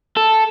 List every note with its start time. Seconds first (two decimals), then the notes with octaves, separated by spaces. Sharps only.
0.17 A4